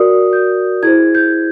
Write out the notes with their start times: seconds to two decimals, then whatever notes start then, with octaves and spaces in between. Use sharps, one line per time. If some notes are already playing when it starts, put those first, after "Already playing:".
Already playing: F#4 A#4 D5 D#6
0.33 G6
0.83 E4 G#4 C5 G#6
1.15 G6